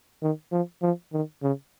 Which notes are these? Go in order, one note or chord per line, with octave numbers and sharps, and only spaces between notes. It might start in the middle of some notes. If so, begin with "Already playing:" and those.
D#3
F3
F3
D#3
C#3